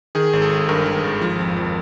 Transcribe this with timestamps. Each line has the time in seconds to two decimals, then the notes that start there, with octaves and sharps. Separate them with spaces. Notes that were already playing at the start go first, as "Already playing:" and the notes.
0.15 D#3 G#4
0.33 G#1
0.42 A4
0.51 G#1
0.69 G2 A#4
0.86 D#3
1.04 G#1
1.21 F3
1.39 F2
1.56 F2